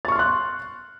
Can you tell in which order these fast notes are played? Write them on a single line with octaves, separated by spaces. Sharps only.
A6 C#6 F6 C6 F#6